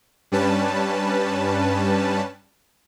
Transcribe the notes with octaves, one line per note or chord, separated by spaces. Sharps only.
G2 G3 C#4 B4 A5